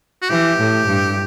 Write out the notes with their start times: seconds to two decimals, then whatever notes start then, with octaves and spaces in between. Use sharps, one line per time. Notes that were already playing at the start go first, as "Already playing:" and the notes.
0.22 F#4
0.30 E3 G4
0.60 A2
0.88 G2